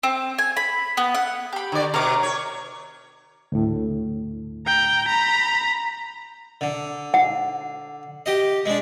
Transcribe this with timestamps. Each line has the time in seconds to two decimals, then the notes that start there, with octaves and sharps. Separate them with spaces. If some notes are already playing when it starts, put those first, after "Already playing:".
0.03 C4
0.38 G#5
0.57 B5
0.97 B3
1.14 F#5
1.53 G4 B5
1.72 D3 D5
1.94 B2 A#4 C#5 D6
2.23 C#5
3.52 D2 A2
4.67 G5 A#5
5.08 A#5 B5
6.61 D3
7.14 F#5
8.26 G4 D#5
8.66 G#3 D4